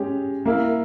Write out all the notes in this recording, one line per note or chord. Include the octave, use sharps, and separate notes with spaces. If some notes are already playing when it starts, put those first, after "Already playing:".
Already playing: G#3 C#4 G4
A#3 E4 A#4